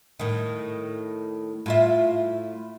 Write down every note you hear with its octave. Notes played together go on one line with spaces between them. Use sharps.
A2 D#3
A2 F4 E5